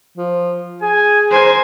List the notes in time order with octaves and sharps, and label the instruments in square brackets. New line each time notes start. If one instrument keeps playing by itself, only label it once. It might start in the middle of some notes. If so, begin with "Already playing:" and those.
[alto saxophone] F3
[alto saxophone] G#4 [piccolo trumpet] G#5
[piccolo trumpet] A#4 [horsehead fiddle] C5 G#5